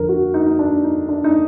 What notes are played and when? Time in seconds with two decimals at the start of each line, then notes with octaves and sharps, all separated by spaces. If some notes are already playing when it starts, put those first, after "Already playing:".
Already playing: F2 D3 F3 A#4
0.09 F#4
0.34 D#4
0.46 D#4
0.59 D4
0.84 D#4
1.08 D4
1.24 D#4